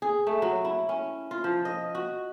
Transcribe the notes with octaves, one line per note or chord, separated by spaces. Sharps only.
G#4
A3
F#3
E4
C#4
F4
F3
D#5
F#4